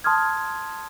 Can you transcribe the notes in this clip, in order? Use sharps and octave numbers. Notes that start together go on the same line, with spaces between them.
A5 C6 D#6 F6 G#6